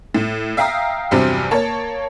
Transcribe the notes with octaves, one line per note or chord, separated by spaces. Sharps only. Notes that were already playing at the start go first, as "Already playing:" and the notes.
A2
E5 F5 G5 A#5 D#6
E2 G2 C3 F#3 C4
A#3 C#5 A5